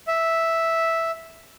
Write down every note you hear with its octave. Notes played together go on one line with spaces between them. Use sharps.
E5